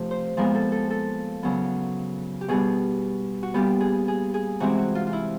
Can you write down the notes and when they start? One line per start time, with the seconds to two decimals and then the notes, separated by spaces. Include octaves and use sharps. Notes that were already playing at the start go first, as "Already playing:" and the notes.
Already playing: C3 F3 A3 A4
0.11 C5
0.37 A#2 F3 G#3 B3 A#4
0.55 A4
0.72 A4
0.90 A4
1.43 C#3 F#3 B3
2.41 G4
2.48 B2 G3 B3 G#4
3.43 F#4
3.54 A#2 G3 B3 G4
3.81 G#4
4.08 G#4
4.34 G#4
4.60 C3 E3 G#3 C4 F#4
4.78 F#4
4.95 F4
5.07 F4
5.13 E4